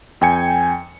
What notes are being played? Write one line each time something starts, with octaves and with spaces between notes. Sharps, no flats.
F2 G5 G#5 C#7